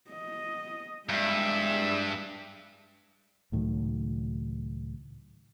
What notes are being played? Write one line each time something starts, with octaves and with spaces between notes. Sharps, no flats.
D#5
G2 G#3 E5
C#2 A2 D#3 F#3